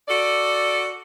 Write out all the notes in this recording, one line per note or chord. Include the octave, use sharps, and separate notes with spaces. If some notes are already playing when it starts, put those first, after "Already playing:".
F#4 A4 D5